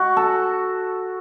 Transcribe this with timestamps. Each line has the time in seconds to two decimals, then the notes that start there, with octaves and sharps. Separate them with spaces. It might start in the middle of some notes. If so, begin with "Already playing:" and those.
Already playing: F#4
0.17 A4